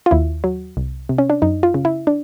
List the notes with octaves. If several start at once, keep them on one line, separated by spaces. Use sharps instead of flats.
F4
D#2 E4
F#3
C2
C3
C#4
D4
F#2 D#4
F4
C#3
E4
D4